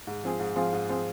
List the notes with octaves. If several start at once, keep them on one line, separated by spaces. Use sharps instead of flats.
G#2
F3 C4 F4 G#4
G#2
F3 C4 F4 G#4
G#2
F3 C4 F4 G#4